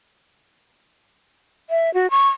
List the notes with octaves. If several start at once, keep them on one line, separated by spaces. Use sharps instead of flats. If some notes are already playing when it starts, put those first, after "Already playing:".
E5
F#4
C#6